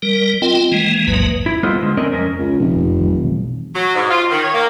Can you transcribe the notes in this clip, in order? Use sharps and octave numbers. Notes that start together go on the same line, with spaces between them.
G3 A#4
C4 F4 D#5 G5
E3 G#3 A#3
A1 D#2 G#2 F#3 A#3 B4
E4
G3 B3 F4 A4 C5 D#5
D3 G#3
A3 C4 C#4 A#4 D5 D#5
F2 C3 C#4 A#4
C#2
F1 B2 F3
F2
A#1 D#3 F#3
B2 E3 G3
F#3
G#2
F4
D#3
C#5
A#3